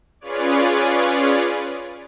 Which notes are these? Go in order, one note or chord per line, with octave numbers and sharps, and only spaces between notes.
C#4 F4 G#4 B4 C#5 D5